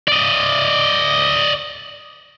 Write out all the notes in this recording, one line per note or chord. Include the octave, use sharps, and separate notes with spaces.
D5 D#5